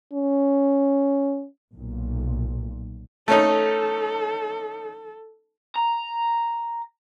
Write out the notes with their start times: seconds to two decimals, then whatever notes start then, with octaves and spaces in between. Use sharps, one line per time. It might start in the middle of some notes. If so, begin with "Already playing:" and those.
0.13 C#4
1.73 B1 A#2
3.28 A3 C#4 D#4 A4
5.76 A#5